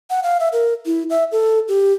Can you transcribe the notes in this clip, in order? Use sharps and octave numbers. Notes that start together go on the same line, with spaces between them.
F#5
F5
E5
A#4
E4
E5
A4
G4